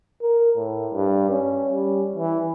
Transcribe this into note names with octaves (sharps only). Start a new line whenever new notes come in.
A#4
A2
G2
C#4
G3
E3